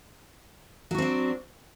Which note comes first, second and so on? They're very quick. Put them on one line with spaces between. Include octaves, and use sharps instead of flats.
F#3 F#4 C4 D4